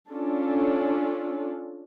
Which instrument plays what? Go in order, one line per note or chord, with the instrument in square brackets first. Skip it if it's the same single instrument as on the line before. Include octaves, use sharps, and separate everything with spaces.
[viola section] C#4 D4 F4 A4